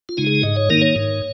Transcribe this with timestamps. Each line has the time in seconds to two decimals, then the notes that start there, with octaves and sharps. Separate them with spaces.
0.09 F4
0.17 C#3 G#3 D#4
0.26 G#4
0.43 G#2 D#5
0.57 C#5
0.70 D#3 A#3 D#4 A#4
0.82 C#5
0.96 G#2